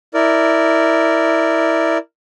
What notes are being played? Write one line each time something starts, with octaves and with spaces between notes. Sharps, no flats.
E4 A#4 D5